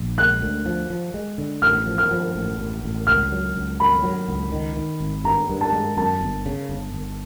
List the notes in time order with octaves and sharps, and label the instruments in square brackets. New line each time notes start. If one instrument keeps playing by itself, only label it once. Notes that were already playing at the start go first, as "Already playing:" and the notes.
Already playing: [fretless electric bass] A#1
[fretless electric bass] G#3 [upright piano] F#6
[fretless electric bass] D2
F3
F3
G#3
D3
[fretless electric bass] A1 [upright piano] F6
[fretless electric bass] F3
[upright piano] F6
[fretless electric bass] F3
A1
A1
A1
[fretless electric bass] C#2 [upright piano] F6
[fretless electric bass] F#3
C#2
[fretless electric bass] F#3 [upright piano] B5
[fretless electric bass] F#3
C#2
D#3
D#3
G#1
[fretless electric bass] G2 [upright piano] A#5
[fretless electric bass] G2
[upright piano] A5
[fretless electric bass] G#3
[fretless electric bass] F#2 [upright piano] A5
[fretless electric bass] G1
C#3
G1
G1